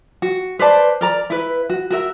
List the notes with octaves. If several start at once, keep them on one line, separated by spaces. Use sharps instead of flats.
F#4
B4 C5 D5 A5
A#4 D5 A#5
E4 B4
F#4
F#4 A#4 E5